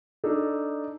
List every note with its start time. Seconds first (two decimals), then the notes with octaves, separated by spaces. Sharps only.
0.24 D4 D#4 A4